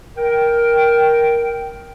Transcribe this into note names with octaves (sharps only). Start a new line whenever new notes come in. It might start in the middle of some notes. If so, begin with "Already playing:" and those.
A#4 G5